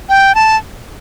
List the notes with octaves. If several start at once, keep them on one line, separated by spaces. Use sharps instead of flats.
G5
A5